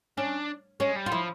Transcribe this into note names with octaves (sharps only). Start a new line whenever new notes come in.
C#4 D4
G#3 C#4
G3
F4
F3 E4